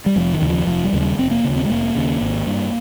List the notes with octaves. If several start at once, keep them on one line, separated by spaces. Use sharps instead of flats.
G3
F1 F3
D#3
D#2 C#3
F3
F1 F3
G3
D#2 C#3
G3
F1 C4
A#3
D#2 C#3
C4
G#3
F1 A#3
D#2 C#3
G#1
G2